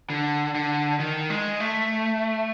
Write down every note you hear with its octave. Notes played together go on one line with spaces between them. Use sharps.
D3
D3
D#3
G#3
A3